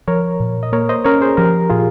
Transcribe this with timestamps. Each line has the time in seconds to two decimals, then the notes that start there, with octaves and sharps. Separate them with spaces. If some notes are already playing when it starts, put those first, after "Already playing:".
0.08 F3 A#4 C#5
0.40 A#2
0.63 D#5
0.72 A#3 A#4 C#5
0.89 C5 D#5
1.04 C#4 A#4 C#5
1.21 G#4 C5
1.37 F3 G4 A#4
1.70 A#2 F4 G#4